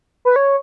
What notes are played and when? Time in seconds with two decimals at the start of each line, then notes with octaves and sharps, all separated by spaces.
0.25 B4
0.36 C#5